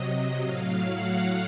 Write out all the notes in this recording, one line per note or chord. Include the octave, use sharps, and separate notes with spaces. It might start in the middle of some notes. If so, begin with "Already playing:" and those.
Already playing: C3 F#3 D#5
A2 F#3 F5
F#5